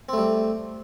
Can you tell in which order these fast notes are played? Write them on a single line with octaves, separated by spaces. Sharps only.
C4 A3 G3